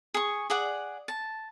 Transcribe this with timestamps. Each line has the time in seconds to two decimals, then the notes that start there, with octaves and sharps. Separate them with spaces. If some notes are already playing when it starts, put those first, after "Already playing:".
0.14 G#4 C#6
0.50 G#4 D5 F#5
1.08 A5